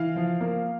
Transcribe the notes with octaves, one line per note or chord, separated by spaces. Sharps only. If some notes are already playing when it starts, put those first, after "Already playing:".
Already playing: E3 F5
F3
A#3